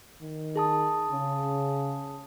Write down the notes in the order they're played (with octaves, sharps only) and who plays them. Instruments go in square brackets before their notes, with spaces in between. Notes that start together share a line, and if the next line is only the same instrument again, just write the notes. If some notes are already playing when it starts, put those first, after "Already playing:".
[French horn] D#3
[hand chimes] G#4 A5 D#6
[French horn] C#3